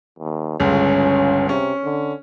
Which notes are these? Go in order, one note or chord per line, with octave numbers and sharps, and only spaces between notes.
D#2
G1 C#2 C#4
C3 C#4
D3